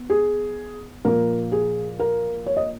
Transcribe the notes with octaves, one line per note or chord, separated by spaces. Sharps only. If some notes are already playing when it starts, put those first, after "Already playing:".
Already playing: B3
G#4
A#2 F3 A#3 A#4
G#4
A#4
C#5
D#5